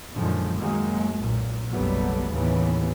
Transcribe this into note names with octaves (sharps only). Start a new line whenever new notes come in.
F#2 A#2 D3 D#3 F3 G#3
F#2 D#3 F#3 G#3 A#3
B1 A#2
F#1 B1 F#3 G3 A3 B3
D#2 A2 C#3 E3 B3